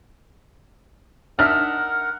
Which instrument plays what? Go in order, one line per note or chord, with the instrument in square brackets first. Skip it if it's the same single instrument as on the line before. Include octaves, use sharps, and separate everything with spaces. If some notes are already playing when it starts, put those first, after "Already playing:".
[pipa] D4 D#4 E5 [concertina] A#4 F#5 [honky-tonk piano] F6